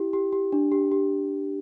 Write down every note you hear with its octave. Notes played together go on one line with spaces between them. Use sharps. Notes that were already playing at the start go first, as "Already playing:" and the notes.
Already playing: E4 G4
G4
G4
D4
G4
G4